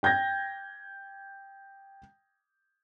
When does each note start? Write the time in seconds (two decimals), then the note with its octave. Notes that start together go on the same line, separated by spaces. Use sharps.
0.03 G5 G6 G#6 A#6